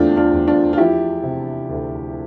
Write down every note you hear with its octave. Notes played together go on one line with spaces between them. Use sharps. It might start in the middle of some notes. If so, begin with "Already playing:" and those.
Already playing: E2 D3 A3 C4 D4 F4
D4 F4
E2
D4 F4
F4
F3 E4 G4
C3
D2